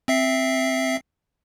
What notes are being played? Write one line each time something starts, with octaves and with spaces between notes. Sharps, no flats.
C4 E5 C7